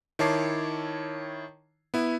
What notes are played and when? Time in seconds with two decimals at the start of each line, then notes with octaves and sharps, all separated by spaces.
0.19 D#3 E4 C#5 A5 D6 C7
1.94 B3 E4